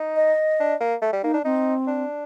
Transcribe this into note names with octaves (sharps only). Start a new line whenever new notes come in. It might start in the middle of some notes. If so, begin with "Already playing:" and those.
Already playing: D#4
D#5
D4
A#3
A3
G3
A#3 D#4
D4
C4 D#4
D4